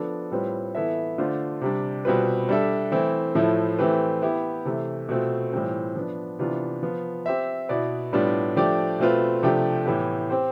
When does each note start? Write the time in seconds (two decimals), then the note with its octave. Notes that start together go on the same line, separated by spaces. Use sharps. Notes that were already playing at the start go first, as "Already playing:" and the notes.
Already playing: F3 B3 D4 A4
0.31 A2 G3 C4 F4 B4
0.75 E3 B3 E4 A4 E5
1.18 D3 A3 D4 F4 C5
1.61 C3 G3 D4
2.05 B2 G3 C4 F4 B4
2.49 G3 D4 A4 E5
2.92 E3 A3 C4 E4
3.35 A2 F3 A3 E4 A4
3.79 E3 A3 C4 G4 B4
4.22 B3 E4 G4
4.65 C3 E3 A3
5.09 B2 A3 C4 F4
5.52 A2 E3 G3 C4 F4
5.95 F3 B3 D4
6.39 C3 E3 B3 D4 F4
6.83 F3 B3 F4
7.26 C4 G4 C5 E5
7.69 B2 B3 E4 B4 D5
8.13 A2 G3 B3 D4 F4
8.56 F3 A3 D4 G4 D5
8.99 B2 A3 C4 F4 B4
9.43 C3 F3 A3 D4 G4
9.86 A2 E3 B3 E4 G4
10.30 C4 G4 C5